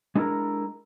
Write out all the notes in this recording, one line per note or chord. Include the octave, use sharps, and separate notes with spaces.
G#3 D4 E4 A4 A#4 A#5